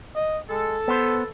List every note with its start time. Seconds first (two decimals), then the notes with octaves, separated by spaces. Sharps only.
0.16 D#5
0.50 G#3 A4
0.88 B3 B4 C5